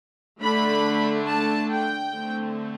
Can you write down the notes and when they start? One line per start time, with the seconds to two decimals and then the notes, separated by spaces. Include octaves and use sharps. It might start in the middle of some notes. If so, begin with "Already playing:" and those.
0.41 D3 A3 D4 B5
1.28 A5
1.70 G5
2.14 D3 A3 C4